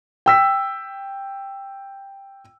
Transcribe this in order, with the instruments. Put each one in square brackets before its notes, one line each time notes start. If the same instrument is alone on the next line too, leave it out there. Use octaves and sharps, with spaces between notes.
[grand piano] G5 E6 B6